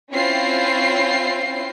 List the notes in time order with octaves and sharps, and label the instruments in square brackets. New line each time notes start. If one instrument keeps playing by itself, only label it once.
[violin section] C4 C#4 E4 F4 G5 C7